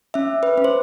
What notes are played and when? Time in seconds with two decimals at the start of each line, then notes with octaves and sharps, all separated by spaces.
0.14 C#4 E5
0.43 B4
0.58 C#4
0.64 C5